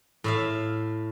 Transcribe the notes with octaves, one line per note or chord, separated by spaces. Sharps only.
A2 E5 F5